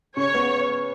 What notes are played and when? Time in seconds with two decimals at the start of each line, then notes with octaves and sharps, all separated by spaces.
0.17 C#3 C#5
0.34 B3